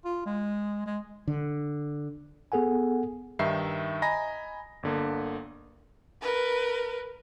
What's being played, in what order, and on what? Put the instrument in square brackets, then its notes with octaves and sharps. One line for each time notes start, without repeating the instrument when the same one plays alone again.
[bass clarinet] F4
G#3
G#3
[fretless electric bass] D3
[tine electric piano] B3 G#4 A4 F#5 G#5
[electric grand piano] G2 D#3 D#4 E5 C7
D#5 G#5 A#5 B5 A#6
G1 D3 A#3
[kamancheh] A#4 B4